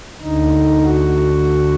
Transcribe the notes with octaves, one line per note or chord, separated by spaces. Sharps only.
D2 D3 D#4
F#4